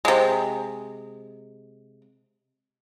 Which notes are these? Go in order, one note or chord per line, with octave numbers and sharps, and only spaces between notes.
C3 G#3